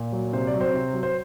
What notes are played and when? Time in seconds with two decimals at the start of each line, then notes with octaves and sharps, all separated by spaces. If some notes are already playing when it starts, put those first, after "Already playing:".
Already playing: A#2
0.12 F#3
0.33 C3 C5
0.47 D5
0.54 F#3
0.60 C4 C5
0.74 C3
0.93 F#3
1.03 C5